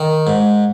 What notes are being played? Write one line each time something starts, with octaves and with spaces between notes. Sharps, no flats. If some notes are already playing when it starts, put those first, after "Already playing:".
Already playing: D#3
G#2